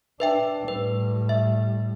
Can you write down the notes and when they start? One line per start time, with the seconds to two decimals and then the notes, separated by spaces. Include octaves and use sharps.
0.20 D4 B4 E5 G5
0.68 A2 G3 B4
1.29 E5